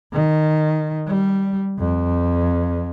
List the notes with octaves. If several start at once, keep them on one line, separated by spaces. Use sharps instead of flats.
D#3
G3
F2